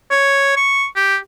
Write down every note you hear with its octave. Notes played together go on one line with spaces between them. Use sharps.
C#5
C#6
G4